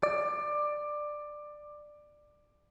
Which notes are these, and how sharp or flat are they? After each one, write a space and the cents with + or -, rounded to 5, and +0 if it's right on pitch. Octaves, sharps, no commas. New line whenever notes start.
D5 +15